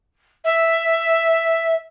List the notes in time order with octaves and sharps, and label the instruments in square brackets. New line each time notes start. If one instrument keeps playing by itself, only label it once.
[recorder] E5